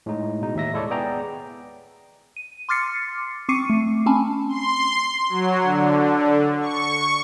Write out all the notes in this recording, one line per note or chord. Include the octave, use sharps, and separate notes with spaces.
A2 G#3 D#4
B2 D#4
D#2 A2 E5 A#6
G#3 E4 A4 C#5 D5
B3 G#4 D5 G5 A#5
D#7
C6 D6 F6 A6 C7 C#7
C4 C#6 D6 C7 C#7 D#7
A3
C4 C#4 G#5 A5 B5
C6
F#3
D3
C#6